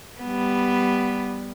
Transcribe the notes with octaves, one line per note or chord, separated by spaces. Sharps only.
G3 B3